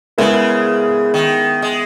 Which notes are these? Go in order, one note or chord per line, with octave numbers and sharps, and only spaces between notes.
C#3 G#3 B3 E4 A#4
D#3
G#3